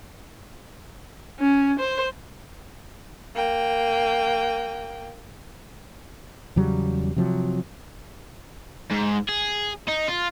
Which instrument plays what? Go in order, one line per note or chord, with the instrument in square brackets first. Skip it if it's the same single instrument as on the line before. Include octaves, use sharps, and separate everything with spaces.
[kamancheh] C#4
C5
A#3 G5
[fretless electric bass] E2 C#3 F#3 G3
C3 F3 F#3
[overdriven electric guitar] G#2
G#4
D#4
F4